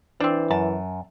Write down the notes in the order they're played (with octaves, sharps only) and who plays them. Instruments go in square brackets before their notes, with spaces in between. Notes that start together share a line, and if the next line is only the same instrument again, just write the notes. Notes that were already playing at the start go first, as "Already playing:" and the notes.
[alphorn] E3 [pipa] C4 D4 [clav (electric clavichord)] C5
[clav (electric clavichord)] F#2 [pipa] A5